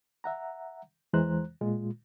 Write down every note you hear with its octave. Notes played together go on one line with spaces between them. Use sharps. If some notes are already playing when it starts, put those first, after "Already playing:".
E5 F#5 A#5
E2 E3 G#3 C5 A#5 F#6
A#2 G#3 F4